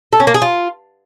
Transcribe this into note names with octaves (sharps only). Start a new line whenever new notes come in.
A4
C#4
A#3
G#4
F4